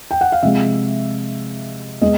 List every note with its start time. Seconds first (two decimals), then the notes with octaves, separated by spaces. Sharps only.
0.11 G5
0.21 F#5
0.32 F5
0.43 C3 F3 G#3 E5
2.02 G#3 B3 D#5